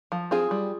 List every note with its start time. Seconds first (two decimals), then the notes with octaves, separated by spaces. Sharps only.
0.12 F3
0.31 C4 F4 G#4
0.51 G3